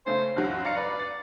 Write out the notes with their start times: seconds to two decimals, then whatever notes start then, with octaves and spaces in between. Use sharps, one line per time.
0.06 C#3 A3 C#4 C5
0.36 C#2 F#2 F#3 F#4
0.65 D5 F5 A#5 C#7
0.76 B4 D5
0.99 A6